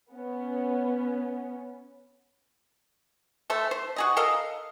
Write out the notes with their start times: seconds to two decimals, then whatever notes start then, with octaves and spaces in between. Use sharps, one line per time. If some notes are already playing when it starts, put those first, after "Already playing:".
0.12 B3 C#4
3.50 A3 A4 C5
3.71 C5
3.96 F#4 G#4 D#5
4.17 A4 A#4 D#5 F5